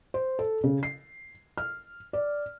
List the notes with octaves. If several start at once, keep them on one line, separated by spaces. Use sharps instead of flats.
C5
A4
C#3
C7
F6
D5